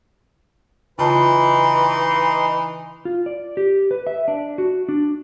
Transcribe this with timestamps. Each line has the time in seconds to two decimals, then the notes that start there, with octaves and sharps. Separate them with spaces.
0.99 C#3 E3 D#4 F4 B4 A5 C6
3.05 F4
3.26 D5
3.57 G4
3.91 B4
4.07 E5
4.28 D4
4.58 F#4
4.89 D4